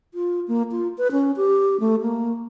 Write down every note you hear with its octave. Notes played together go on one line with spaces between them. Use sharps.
F4
A#3
F4
B4
C#4
G4
A3
A#3